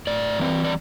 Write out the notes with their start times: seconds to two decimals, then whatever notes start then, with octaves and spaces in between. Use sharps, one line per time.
0.07 A2 D5
0.39 E3 G3 C4
0.64 D5